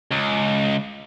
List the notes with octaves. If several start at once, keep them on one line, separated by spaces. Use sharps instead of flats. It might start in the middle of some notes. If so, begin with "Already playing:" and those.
C#2